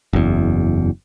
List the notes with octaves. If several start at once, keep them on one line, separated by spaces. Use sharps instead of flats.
F#1 E2